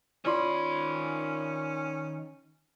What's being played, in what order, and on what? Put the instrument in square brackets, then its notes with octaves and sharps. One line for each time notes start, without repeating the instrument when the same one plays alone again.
[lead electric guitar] D#3 B5 [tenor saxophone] C#4 [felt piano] F4 D5 C6